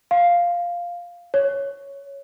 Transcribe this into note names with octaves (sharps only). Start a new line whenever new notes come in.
F5
C#5